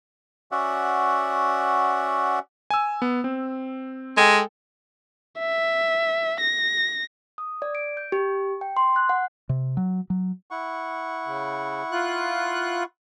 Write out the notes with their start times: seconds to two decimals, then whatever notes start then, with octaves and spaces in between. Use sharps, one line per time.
0.52 C#4 F#4 D5 E5 F#5
2.70 G#5 E6
3.02 B3
3.24 C4
4.17 G#3 A4 G5 G#5
5.39 E5
6.40 A#6
7.38 D#6
7.62 D5
7.75 D7
7.97 G6
8.12 G4
8.61 G5
8.77 C6
8.96 F#6
9.09 F#5
9.49 C3
9.77 F#3
10.10 F#3
10.50 E4 F#5 C#6
11.26 C#3
11.92 F4 F#6